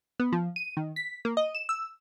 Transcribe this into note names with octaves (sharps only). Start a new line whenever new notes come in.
B3
F3
D#7
D#3
B6
A#3
D#5
E7
E6